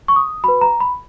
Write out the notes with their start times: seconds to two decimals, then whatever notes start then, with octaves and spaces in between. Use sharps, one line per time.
0.08 C#6
0.16 D#6
0.44 F#4 B4 B5
0.61 A#5
0.80 B5